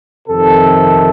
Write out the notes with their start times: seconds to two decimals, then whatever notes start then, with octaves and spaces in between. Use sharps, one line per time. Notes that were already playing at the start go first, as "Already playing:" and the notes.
0.28 F2 C3 D#3 A4